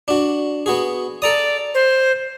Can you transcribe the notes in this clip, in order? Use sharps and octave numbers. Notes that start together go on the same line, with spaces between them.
D4 F#4
B3 F#4 G#4
A4 D5 A#5 D#6
C5